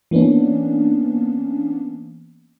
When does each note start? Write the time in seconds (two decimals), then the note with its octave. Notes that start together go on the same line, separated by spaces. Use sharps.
0.11 E3 A#3 B3 C#4 D4